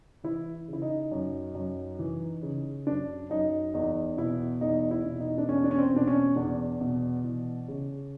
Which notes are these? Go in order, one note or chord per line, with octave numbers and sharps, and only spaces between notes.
E3 E4
C#3
E4
D#4
F#2
F#2
E3
C#3
F#2 D4
F#2 D#4
E2 D#4
B2 E4
E2 D#4
E4
B2
D#4
D4
E2 C#4
D4
C#4
C4
B2 D4
C#4
E2 D4
B2
E3
C#3